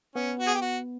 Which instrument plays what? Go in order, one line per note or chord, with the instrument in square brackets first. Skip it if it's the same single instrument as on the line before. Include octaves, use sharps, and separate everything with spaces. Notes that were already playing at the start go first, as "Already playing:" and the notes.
[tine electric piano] B3 [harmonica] C#4
[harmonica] F#4
G#4
G4
F#4